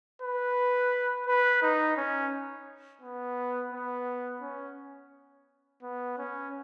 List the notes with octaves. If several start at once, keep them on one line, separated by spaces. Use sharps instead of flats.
B4
B4
D#4
C#4
B3
B3
C#4
B3
C#4